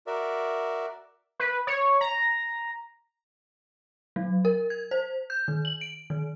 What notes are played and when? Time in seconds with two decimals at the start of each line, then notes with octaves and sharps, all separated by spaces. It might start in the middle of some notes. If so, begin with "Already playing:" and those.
0.07 F#4 A#4 D5 E5
1.40 B4
1.67 C#5
2.01 A#5
4.16 F#3
4.45 A#4
4.70 G#6
4.91 C5
5.30 G6
5.48 D#3
5.65 F#7
5.81 D7
6.10 D#3